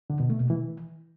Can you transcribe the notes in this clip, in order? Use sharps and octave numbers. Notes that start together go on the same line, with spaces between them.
D3
B2
A3
B2
E3